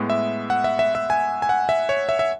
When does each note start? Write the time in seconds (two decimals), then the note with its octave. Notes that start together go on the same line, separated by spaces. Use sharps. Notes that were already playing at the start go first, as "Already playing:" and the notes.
Already playing: A2 G#3 B3
0.10 E5
0.50 F#5
0.64 E5
0.79 E5
0.95 E5
1.10 G#5
1.42 G#5
1.49 F#5
1.69 E5
1.89 C#5
2.09 E5
2.19 E5